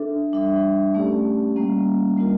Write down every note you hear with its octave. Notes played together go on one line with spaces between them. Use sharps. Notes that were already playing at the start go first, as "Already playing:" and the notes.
Already playing: D4 A4 E5
G3 D4 A4 E5
A3 C#4 G4 D5
G3 A#3 C#4
G3 A#3 D4 F4 A#4